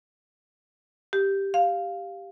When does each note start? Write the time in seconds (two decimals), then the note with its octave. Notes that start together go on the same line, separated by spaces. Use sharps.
1.13 G4
1.54 F5